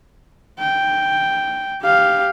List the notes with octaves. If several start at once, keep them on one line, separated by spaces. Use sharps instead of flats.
G5
G4 F5